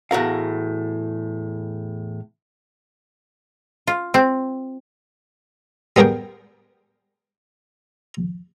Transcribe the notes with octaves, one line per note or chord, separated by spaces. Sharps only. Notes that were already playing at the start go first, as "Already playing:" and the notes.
E2 A2 F#4 A#4 F5
F4
C4
G3 B3 G#4 A#4 G5